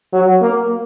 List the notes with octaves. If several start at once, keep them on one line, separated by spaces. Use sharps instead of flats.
F#3
A#3